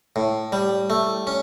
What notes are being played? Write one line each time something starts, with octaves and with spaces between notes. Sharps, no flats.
A2
G3
A3
C#4